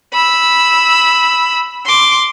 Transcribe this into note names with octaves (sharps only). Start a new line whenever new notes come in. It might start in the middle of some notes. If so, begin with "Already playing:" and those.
B5 E6
C6 D6